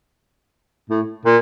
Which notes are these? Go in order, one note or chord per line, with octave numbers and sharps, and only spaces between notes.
A2
A#2